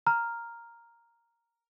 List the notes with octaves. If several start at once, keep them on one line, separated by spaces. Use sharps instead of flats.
A#5 F6